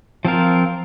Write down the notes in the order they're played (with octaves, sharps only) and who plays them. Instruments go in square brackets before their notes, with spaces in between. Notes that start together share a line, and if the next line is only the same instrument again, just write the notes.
[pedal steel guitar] F3 C4 F4 A#4